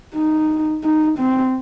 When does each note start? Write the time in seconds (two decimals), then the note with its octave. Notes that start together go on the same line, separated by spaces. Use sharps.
0.15 D#4
0.84 D#4
1.19 C4